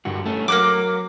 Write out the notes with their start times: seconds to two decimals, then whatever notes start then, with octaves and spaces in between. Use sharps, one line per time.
0.05 G2 D3 F#4
0.26 A3 C#4
0.48 F#3 A#3 F#5 D6